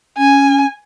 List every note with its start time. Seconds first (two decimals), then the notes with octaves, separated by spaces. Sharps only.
0.18 C#4 G#5